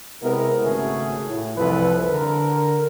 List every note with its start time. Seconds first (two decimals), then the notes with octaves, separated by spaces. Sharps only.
0.23 C3 G#3 B3 E4 A#4
0.62 G#1 C#3 A3 C#4 F#4 G#4
1.27 A2
1.57 C2 F2 E3 F3 A4 B4
2.09 D3 A#4